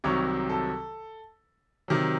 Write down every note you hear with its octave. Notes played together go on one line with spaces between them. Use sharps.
C2 C3 D#3 F#3 C#5
A4
C3 D#3 F#3